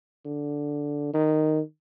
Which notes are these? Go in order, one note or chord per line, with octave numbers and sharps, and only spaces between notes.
D3
D#3